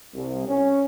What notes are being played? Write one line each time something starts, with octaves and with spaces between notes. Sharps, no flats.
C2
C#4